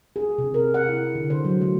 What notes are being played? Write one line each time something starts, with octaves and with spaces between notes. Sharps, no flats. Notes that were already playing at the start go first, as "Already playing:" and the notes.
G#4
C3
A#4
F#5
E4
D3
C5
F#3
A3